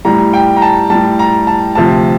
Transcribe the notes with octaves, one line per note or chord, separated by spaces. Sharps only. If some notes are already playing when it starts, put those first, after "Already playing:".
A2 G3 A#5
G5
A#5
A5
A2 G3 A5
A#5
A5
D2 C3 F3 A5